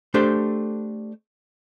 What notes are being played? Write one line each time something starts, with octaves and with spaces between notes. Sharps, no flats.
A3 D4 G4 A4 C5